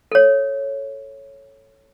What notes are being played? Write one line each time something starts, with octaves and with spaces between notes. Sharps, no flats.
A4 C#5